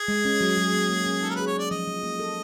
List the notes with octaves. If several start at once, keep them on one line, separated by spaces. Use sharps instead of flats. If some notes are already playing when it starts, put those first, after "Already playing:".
Already playing: G#4
G#3
C#4
F#3
F#3
A#3
A#3
C#4
D#4 A4
A#4
G#4 B4
C#5
A#3 D5
F3 D#5
F3
A#3
A4